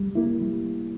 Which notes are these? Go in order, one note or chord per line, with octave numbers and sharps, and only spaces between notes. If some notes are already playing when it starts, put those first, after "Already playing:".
Already playing: G3
A#3 E4
G3